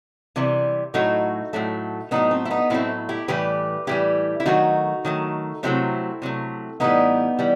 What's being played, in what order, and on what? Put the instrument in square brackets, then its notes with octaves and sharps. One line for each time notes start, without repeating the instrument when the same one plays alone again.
[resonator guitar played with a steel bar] C3 E3 G3
A2 F#3 A3 D#4 F#4
A2 F#3 A3
A2 F#3 A3 B3 D#4
C4
E4
B3 D#4
A2 F#3 A3 C4 E4
E4 G4
A2 E3 G3 G4 B4
A2 E3 G3 E4 G4
E4
D#3 F#3 A3 D#4 F#4
D#3 F#3 A3
C3 F#3 A3 C4 E4
C3 F#3 A3
A2 E3 G3 B3 D#4
E3 G3